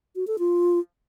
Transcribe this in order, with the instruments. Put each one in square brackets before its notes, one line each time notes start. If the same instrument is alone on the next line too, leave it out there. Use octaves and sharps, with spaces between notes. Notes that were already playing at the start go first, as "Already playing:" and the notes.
[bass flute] F#4
A4
F4